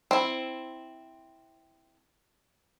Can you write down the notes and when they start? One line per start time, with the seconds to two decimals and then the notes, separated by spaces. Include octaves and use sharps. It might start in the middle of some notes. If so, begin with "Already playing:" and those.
0.11 C4 E4